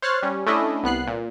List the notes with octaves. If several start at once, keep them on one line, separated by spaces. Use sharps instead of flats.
C5 C#5 F6 F#6 A6 C7
G3 C#4
A3 C#4 D4 E4 D#5 E5
C2 B3 F#6 C7
A#2